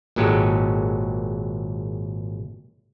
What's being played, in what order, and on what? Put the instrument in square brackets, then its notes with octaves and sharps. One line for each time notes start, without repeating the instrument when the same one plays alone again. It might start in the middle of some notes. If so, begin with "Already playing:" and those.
[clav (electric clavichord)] G#1 A#2 F#3 G#3 G4 A4